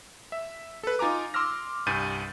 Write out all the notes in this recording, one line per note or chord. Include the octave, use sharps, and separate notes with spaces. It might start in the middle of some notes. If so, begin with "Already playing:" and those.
E5
A4 B4
D#4 F4 G#5 A#5 D6
C6 D6 E6 F6 A#6
C2 G2 G#5 G6 A6 D#7